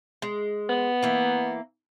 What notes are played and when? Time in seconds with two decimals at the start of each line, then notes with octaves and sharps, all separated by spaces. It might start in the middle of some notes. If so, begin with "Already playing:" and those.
0.22 G#3
0.69 B3
1.03 E3 A#3